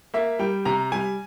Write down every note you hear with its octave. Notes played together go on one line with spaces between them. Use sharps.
A#3 E5
G3 G5
C3 A#5
G3 G#5